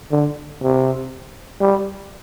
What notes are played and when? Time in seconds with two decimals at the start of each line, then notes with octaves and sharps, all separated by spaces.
0.11 D3
0.61 C3
1.61 G3